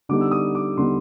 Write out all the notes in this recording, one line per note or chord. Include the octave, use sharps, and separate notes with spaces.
D3 G3 B3 D#4 D6
E6
D#6
D6
D3 G3 B3 D#4 C6